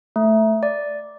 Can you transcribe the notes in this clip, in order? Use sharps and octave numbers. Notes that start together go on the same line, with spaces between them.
A3
D5